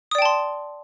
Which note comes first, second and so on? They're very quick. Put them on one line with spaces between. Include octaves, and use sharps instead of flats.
D#6 D5 G5 A5 C6